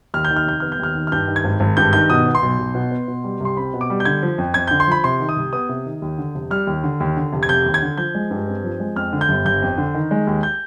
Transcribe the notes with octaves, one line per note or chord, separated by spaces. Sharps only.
D#2 F6
G6
D#3
F6
F1 G6
B3 F6
G6
D#2 F6
D#3
F6
G2 G6
D#3
G#6
G#1
G#1
G2 G6
D#3 G6
B2 D#6
B3
C6
B1
B1
B2
B3
B2
G3
C2 C6
C4 B5
B2
D6
G3
G6
D3 G#6
F3
F2
F2 G#6
D3 G6
C6
F3 B5
C3 C6
D#3
D#6
C2
B3 D#6
C3
D#3
D#2
D3
F1
G3 F6
D#2
D3
D#2
D3
F1
G#6
F1 G6
D#2
G#6
D3
F3 G6
G#3
G2
C4
F3
G#3
F2 F6
D3
G6
G1
G1 G6
F2
D3
D#3
G#3
D#2
G6